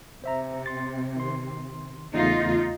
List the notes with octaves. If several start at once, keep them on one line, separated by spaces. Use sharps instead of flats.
C3 C5 E5 A#5
C6 A6
D#3 C6
E2 C#3 A3 D#4 F4